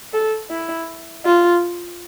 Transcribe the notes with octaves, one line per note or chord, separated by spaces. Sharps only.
A4
E4
F4